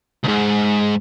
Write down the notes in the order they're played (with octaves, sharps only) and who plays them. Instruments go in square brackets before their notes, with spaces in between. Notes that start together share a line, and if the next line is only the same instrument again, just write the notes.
[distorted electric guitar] C#2 G#2